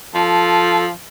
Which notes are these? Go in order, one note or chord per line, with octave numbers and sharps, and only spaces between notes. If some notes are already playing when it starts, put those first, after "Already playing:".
F3 A4